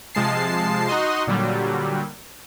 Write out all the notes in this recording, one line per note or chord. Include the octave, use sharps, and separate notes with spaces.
C3 F3 G#3 A5 C7
D#4 F#4 D#5 C6
A#2 D3 F#3 G3